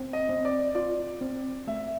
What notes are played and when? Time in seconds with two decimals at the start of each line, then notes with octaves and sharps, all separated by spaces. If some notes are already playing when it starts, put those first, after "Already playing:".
Already playing: C4
0.13 D#5
0.29 C4
0.45 D5
0.75 F4 D5
1.21 C4
1.67 A3 E5